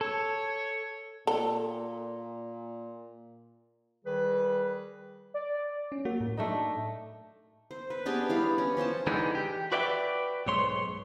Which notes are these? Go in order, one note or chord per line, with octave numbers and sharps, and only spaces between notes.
A4 C#5
A#2 A4
D#3 G3 G#4 B4
D5
C#4
A#3 F#4
A2
A3 D4 D#4
C5
B4
B3 D4 G4 G#4
E3 G3 D4 F5
C#4
F3 C#4 C5 A5
D3 E3 G#3 B3 D#4
G4
F#4 B4 D5 E5 F5 G5
B1 G#2 C#5 C6